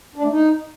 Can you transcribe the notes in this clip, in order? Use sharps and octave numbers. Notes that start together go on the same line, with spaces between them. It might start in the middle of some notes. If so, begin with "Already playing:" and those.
D4
A3
D#4